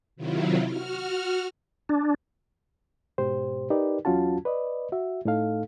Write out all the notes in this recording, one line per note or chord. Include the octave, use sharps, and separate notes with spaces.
C3 D#3 F#3 E4 F4
F#4 F6
D4
G#2 B2 G4 C5
D#4 G4 A#4 B4 D5
E2 F#3 C#4 F4 F#4 A5
B4 D5 D#5
F#4 E5
A2 A3 D#4 A4 F5